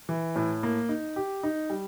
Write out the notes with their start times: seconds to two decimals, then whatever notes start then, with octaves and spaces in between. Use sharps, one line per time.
0.09 E3
0.36 A2
0.63 A#3
0.89 D#4
1.16 G4
1.43 D#4
1.70 G3